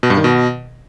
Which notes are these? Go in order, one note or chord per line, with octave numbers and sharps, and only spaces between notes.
B2
G2
D#3
B2